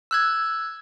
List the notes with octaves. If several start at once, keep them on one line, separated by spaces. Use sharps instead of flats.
E6 F#6 G#6